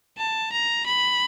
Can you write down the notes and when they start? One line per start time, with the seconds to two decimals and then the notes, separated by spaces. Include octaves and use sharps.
0.18 A5
0.52 A#5
0.86 B5